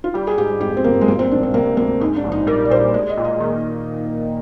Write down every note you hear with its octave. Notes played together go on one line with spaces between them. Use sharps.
F4
G3 G4
G#4
G#2 G4
F2 G4
C4
G1 A#3
G#3
A#2 A#3
C4
A#1 D4
C4
C3 A#3
D2 A#3
G#2 D#4
D4
A#1
D#4
G3 A#4
D5
A#2 C5
G#3 D5
D#5
A#2
D#5
D#3